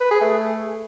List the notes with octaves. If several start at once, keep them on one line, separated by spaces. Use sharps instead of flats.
B4
G#4
A3